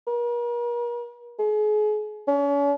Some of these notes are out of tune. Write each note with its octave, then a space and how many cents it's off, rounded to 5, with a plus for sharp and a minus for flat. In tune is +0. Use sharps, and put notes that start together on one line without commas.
A#4 +40
G#4 +35
C#4 +40